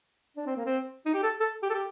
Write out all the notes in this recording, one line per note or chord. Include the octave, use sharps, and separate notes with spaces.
D4
C4
A#3
C4
D#4
G4
A4
A4
G4
A4
G4